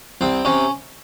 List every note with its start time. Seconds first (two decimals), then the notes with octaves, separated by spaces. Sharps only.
0.21 C2 C4
0.45 C3 C#4